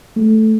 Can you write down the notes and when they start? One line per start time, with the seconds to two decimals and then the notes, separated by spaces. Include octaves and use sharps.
0.16 A3